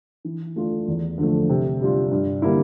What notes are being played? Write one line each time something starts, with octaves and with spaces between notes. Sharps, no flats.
E3
A3 D4 F4
E2
D3 F3 A3
C3
G3 D4 F4
G2
D3 G3 A#3 E4